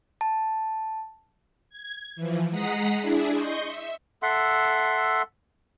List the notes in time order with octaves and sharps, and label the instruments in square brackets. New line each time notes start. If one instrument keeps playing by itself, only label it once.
[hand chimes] A5
[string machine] G#6
E3 F3
G#3 F#5 A#5 D#6 B6 C7
D4 E4 G#4
D#5 C6 C#6 G6 C#7
E5
[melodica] A4 E5 F#5 C6